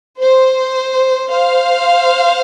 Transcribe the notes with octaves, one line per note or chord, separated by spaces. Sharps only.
C5
C5 F5